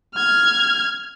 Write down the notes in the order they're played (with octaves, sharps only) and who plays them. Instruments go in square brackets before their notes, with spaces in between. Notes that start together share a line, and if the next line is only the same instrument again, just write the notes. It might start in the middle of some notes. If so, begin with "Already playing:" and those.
[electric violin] F6 G#6